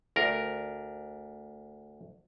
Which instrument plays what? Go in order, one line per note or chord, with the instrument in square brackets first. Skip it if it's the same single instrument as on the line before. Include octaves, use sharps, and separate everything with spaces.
[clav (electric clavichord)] D2 A#4